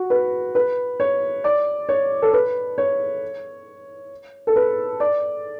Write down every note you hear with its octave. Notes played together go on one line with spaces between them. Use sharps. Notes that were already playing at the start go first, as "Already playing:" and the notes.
Already playing: F#4
B4
B4
C#5
D5
C#5
A4
B4
C#5
A4
B4
D5